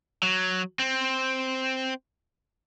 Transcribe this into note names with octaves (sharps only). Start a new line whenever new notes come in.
F#3
C4